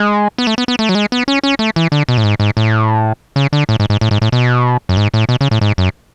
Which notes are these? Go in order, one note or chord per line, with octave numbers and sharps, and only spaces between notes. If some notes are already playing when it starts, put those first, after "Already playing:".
Already playing: G#3
B3
A3
B3
B3
A3
F#3
G#3
B3
C#4
C#4
A3
E3
D3
B2
A2
G#2
G#2
A2
C#3
D3
A2
G#2
G#2
A2
G#2
A2
B2
F#2
G#2
A2
B2
C#3
A2
G#2
F#2